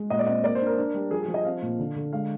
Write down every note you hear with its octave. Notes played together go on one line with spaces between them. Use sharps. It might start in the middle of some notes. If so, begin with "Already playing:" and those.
Already playing: G#3
A#2 D#5
D5
C4 D#5
A#3 D5
C5
D4
A#4
D4
G3
F3 G#4
G#4
F3
D#5
C4 F5
A#2
D3
D3
G#3 F5